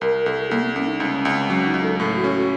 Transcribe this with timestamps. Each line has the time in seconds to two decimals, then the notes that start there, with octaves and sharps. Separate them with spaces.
0.01 C2 A#4
0.26 C2 A4
0.50 C2 A#3
0.62 C4
0.75 C2 C#4
0.87 D#4
1.00 C#2 C#4
1.25 C#2 C4
1.50 F#3 C#4
1.66 D#4
1.74 C#2
1.82 A4
1.99 A2 A4
2.15 F#4
2.24 C#4
2.32 F#4